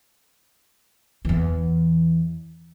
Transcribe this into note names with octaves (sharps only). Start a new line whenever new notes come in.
E2 E3